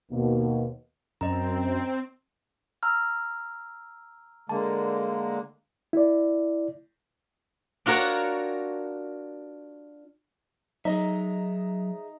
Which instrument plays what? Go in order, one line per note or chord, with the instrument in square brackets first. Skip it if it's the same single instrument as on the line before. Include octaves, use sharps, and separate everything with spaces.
[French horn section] D#2 B2 A#3
[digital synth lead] F#2 [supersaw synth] C4 [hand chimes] D#5 A#5
[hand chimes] A#5 E6 F6
[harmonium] D3 G#3 A#3 [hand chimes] A5
[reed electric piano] E4 D5
[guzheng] D4 F4 F#4 A#4 C#5
[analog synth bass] F#3 [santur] D#4 [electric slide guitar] G#4 D#5 E5